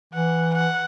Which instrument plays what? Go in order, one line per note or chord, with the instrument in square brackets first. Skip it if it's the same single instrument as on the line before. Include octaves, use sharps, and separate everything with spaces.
[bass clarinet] E3 [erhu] F#5
[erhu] F#5